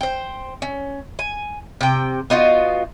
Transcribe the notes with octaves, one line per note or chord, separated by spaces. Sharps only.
C5 G5
C#4
G#5
C3 G5
B3 D#4 F4 F#4